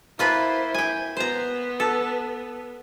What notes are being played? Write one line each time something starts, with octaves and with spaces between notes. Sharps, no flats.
A#3 E4 F4 B4 C5
G5 G#5
B3 B4 C5 A#5
A4